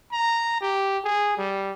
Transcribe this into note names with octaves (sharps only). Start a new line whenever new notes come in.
A#5
G4
G#4
G3